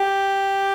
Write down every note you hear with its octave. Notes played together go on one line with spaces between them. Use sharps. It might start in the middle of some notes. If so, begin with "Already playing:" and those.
Already playing: G4